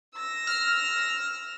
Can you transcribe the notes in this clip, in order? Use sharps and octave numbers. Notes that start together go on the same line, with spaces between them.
E6 A#6
F6